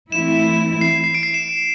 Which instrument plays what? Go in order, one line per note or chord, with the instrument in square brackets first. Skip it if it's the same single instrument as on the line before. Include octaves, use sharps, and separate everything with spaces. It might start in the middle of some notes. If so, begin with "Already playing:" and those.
[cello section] E3 A3 C4 E4 [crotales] E7
[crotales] C7
C7
D7
C7
E7